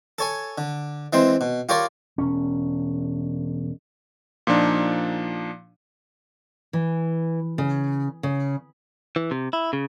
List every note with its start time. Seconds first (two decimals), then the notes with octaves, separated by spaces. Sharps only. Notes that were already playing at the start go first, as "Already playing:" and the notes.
0.19 A4 C#5 G#5
0.58 D3
1.13 E3 G#3 C4 C5
1.41 B2
1.69 F4 G4 A#4 C#5 D5
2.18 E1 C#4
4.47 A#2 F3 D4 D#4
6.73 E3
7.58 C#3
8.23 C#3
9.16 E3
9.31 C3
9.53 E4
9.73 C#3